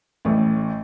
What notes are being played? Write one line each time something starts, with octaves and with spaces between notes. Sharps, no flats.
A1 A2